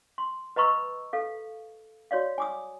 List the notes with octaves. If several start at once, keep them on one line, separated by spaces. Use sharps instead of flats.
C6
B4 D#5 A#5 B5 C#6 E6
A4 F5
F#4 C#5 D5 F5
G#5 D6 D#6